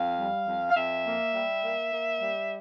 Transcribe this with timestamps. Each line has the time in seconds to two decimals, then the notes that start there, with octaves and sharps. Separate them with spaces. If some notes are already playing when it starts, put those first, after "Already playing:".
Already playing: F2 F5
0.18 G3
0.47 F2
0.70 F5
0.76 F2 E5
1.05 A#3
1.33 G3
1.63 A#3
1.91 A#3
2.21 G3